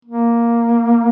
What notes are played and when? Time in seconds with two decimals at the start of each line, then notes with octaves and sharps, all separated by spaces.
0.05 A#3